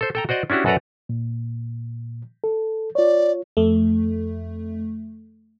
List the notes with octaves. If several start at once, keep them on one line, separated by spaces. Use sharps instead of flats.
A4 C5
A4 G5 A#5
F#4 C5 D5 D#5
C#4 D4 E4 F#4 G4
F#2 F#4 A4 B4 D5 A#5
A#2
A4
F4 C#5 D5
F2 A3